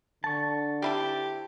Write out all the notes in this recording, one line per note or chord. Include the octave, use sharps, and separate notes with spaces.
D3 A5 C#6
C4 E4 G4 A4